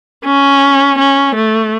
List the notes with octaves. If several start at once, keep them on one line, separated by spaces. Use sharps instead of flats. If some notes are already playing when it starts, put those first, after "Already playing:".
C#4
C#4
A3